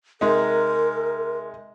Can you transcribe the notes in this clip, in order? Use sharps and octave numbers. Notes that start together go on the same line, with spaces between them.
C3 G#3 D#4 A#4